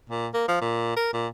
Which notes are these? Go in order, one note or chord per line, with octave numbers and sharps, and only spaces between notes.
A#2
A#3
F3
A#2
A#4
A#2